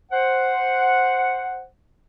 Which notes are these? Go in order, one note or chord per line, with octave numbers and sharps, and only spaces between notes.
C5 F#5